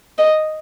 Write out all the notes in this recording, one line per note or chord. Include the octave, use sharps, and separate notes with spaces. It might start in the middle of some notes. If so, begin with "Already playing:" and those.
D#5